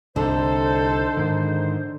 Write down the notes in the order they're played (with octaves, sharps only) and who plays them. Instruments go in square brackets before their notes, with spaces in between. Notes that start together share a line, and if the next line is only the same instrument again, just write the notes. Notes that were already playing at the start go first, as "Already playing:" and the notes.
[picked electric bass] C2 [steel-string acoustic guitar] D3 [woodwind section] D#4 C5 [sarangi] A4
[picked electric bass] G#2 D#3